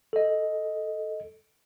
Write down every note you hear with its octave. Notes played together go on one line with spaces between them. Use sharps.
A4 D#5